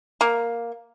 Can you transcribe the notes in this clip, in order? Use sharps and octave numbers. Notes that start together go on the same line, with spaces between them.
A#3